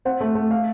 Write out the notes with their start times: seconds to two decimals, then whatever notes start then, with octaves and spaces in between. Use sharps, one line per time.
0.05 C4 F#5
0.21 A3
0.35 A3
0.51 F5